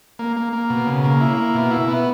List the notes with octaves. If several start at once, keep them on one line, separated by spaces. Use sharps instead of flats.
A#3
A#3
A#3
B2
C#3
A#3
E4
A#3
B2
E4
B3